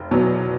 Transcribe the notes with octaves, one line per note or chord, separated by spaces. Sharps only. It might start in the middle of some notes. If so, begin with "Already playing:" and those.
Already playing: F1
E2 B2 F#3